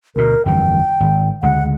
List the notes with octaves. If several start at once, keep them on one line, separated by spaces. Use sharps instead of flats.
D2 B2 A#4
G1 F2 E3 G5
G#1
D2 C#3 G#3 F#5